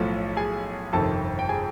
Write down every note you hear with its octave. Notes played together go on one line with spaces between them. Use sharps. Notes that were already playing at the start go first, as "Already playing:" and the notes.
Already playing: B1 A2 F3 A4
G#4 G#5
G1 F2 C3 D#3 A4 A5
G5
G#4 G#5